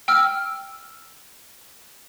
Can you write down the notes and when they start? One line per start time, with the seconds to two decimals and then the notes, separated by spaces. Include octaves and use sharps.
0.08 G5 E6 F6